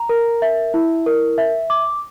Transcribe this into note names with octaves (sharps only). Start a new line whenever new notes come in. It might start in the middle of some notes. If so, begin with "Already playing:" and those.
Already playing: A#5
A#4
E5
E4
A#4
E5
D6